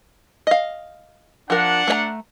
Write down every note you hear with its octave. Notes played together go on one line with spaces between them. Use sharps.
D#5 F5
F3 D4 A#4 F#5
A3 C#5 A#5